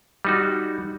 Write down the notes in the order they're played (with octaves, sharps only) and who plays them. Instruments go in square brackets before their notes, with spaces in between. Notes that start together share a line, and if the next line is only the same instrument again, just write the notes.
[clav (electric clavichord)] G3 D#4 F#4